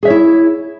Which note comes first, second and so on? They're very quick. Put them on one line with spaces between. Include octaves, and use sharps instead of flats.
G#4 E5 C#5 E4